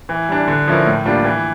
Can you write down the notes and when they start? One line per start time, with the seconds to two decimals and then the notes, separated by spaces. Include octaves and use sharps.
0.09 E3
0.29 G3 D4
0.48 D3
0.68 F3 C#4 E4 A#4
0.86 A2
1.06 G3 A#3 D4 F4
1.24 E3